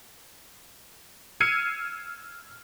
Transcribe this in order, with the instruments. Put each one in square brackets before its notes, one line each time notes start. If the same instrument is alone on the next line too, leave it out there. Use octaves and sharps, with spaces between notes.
[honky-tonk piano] E6 F6 G#6 C7 C#7 D#7